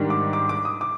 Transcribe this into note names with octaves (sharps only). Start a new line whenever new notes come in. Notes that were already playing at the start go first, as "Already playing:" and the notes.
Already playing: G#2 D#3 G3 D4
D6
D6
D6
D#6
D6